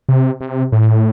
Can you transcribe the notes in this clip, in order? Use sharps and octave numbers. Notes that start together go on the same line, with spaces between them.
C3
C3
A2